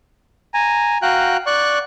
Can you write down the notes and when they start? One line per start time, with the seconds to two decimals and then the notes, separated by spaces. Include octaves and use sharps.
0.54 G#5 A#5
1.02 F#4 F5 G5 A#5 F#6
1.46 D5 C#6 F#6